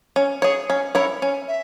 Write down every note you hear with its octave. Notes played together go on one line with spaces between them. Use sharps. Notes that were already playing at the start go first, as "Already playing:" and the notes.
C#4
G#4 C#5
C#4
E4 A#4 C#5
C#4
E5